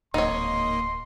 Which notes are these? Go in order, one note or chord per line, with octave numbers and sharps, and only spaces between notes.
D1 G#1 A#3 D#4 C#5 D#5 C6